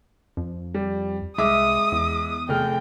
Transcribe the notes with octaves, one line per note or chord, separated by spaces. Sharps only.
F2
G3
C2 G#3 E5 D6 D#6
E2
F1 G#4 G5 F6